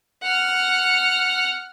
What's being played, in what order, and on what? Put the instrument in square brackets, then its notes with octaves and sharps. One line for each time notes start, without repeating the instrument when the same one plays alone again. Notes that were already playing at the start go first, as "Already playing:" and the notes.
[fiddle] F#5 F6